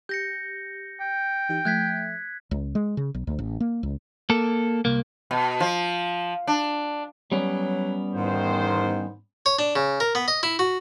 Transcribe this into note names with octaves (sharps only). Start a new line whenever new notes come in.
G4 G6 A#6 C#7
G5
E3 D#4 G4
F3 A3 E5 F#6 G#6 B6
C#2
G#3
C#3
B1
D2
A1
A#3
C#2
A#3 A4
C2 A#3
B2
F3
D4
F#3 G3 B3 C#4
E2 G#2 D#3 C5
C#5
D4
C#3
A#4
B3
D#5
E4
F#4